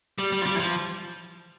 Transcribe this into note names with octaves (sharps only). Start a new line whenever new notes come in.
G3
G3
F3
G3
E3
F3